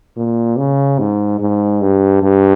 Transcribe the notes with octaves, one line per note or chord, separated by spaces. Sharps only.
A#2
C#3
G#2
G#2
G2
G2